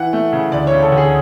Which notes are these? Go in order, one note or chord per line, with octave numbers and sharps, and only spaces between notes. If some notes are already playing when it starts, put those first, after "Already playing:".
Already playing: E3 F#5
A3
C#3
D2 D5
C#5
C#3
A4
D2
G#4